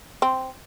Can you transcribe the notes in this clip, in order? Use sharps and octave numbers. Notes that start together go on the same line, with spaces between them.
C4